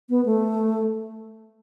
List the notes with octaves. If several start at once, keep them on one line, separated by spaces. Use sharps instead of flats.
B3
A3